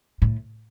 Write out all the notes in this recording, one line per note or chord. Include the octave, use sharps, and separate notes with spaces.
A2